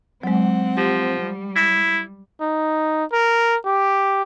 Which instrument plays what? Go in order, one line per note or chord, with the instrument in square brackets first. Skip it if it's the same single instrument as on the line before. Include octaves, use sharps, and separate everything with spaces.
[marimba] F#3 G#3 [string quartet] C4 F#5
[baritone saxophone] F3 [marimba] G4
[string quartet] G3
[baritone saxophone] E4
[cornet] D#4
A#4
G4